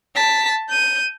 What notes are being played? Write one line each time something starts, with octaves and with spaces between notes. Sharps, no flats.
A5 B6
G6 D#7